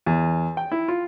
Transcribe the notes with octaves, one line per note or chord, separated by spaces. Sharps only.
E2
G5
E4
F4